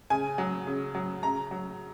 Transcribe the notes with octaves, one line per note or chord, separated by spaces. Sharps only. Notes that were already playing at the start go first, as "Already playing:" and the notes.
C#3 G#5
F#3
C#3
F#3
C#3 A#5
F#3